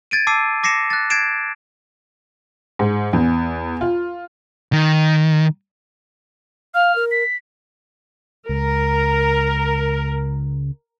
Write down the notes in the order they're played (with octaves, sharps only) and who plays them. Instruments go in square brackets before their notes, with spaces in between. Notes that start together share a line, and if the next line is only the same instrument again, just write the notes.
[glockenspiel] G#6 A6 D7 D#7
A5 D6 E6 C7 D#7
D6 A#6 C7 C#7 E7
F#6 A6
G#6 A6 C7 D7 E7
[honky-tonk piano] G#2
E2
F4
[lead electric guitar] D#3
[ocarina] F5 [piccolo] F6
[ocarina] A#4
[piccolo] B6
[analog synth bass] C#2 [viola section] A#4